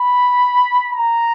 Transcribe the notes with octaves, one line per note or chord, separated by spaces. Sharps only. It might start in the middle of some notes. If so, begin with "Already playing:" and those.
Already playing: B5
A#5